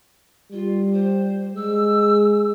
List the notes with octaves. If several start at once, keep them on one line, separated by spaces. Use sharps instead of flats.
G3 F4
C5
G#3 E6